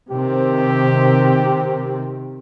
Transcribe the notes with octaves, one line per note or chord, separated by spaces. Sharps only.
C3 D#3 C4 G4